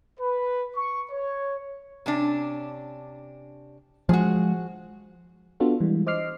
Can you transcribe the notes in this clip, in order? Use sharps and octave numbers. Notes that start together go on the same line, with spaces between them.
B4
C#6
C#5
C3 C#4 D4
F3 F#3 G#3 F#4 G#4
B3 D4 F4 F#4 A4
E3 G3 G#3
C5 D#5 D6 F6 C7